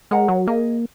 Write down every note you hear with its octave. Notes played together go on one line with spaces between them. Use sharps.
G#3 A#4 C#5 F#5 A#5
F#3
A#3 G#4 D#5 G#5